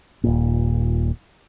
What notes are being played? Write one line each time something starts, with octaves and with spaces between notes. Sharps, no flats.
D#1 A#2